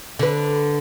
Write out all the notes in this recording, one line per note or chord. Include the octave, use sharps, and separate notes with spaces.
D3 B4